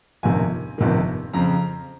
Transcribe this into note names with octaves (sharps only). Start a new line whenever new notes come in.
G1 F2 C3 D#3 G#5
G1 F2 C3 D#3
F2 C#3 F3 C4 A#5